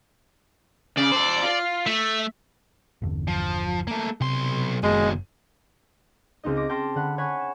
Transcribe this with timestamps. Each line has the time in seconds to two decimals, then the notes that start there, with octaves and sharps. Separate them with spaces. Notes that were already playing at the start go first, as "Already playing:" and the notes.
0.97 C#3 D5
1.12 A4 C5
1.43 F4
1.86 A3 E5
3.02 G1 E2 D3
3.28 F3
3.87 A3 A#3
4.21 B1 C3 C6
4.83 F#1 D#2 B2 G#3
6.44 C#2 C4 D#4 D#5
6.57 D6 A#6
6.69 G5 A5 C6 F6 A#6 D7
6.95 D3 F#5 B5
7.18 C#5 F#5 G#5 B5
7.39 E7